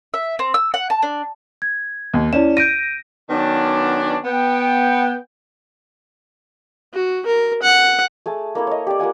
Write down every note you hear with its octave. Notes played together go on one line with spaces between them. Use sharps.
E5
C4
E6
F#5
A5
D4
G#6
D#2
C#4 E4 D5 E7
G6 A#6 D7 D#7
D#3 F#3 B3 C#4 D4
B3 G5
F#4
A#4
F#5
A3 G#4 A5 E6
A#3 E4 A4
C#5 D#5
G4 D5
A#3 F4 F#5 G#5